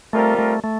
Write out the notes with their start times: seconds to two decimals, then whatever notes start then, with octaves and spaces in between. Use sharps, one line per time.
0.13 G3 A3 C4 F4 A#4
0.39 A3
0.64 A3